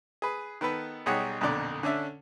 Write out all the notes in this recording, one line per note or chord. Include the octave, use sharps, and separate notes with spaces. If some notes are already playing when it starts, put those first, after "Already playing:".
G#4 B4
D#3 B3 A4 B4
B1 G3 D#4 G#4 C#5 F#5
B1 F2 A#2 D3 D5
D3 C#4 D4 E5